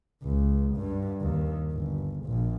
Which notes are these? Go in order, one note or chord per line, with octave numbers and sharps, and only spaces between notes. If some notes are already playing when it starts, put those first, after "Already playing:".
C#2
G2
D#2
G1
A#1